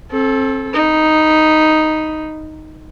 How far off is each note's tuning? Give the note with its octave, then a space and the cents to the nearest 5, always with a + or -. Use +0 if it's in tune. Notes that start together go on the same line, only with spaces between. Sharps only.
C4 +30 A4 -15
D#4 +0 B5 +0